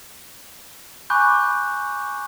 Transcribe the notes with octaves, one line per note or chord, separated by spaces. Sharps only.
G#5 B5 C#6 D6 F#6 G6